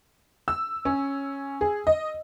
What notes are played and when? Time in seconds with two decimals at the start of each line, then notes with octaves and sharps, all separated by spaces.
0.48 E6
0.85 C#4
1.61 G#4
1.87 D#5